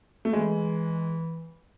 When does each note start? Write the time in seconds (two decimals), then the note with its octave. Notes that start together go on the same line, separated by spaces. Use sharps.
0.25 A3
0.33 E3 G#3